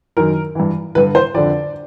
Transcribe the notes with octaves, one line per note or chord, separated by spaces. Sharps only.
F#2 D#3 A#4
G2 E3
G2 D3 B4
C5
F2 D3 D5